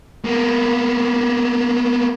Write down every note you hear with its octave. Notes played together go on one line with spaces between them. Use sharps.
A#3 B3